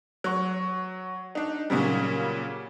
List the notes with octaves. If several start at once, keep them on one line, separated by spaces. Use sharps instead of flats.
F#3 C#6
D4 D#4
A#2 C#3 F#3 G3